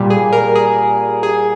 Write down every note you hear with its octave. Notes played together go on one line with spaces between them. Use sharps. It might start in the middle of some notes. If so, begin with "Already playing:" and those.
Already playing: A#2 G3
G#4
A#4
G#4
G#4